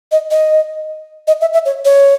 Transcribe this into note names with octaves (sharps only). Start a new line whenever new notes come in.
D#5
D#5
D#5
E5
E5
C#5
C#5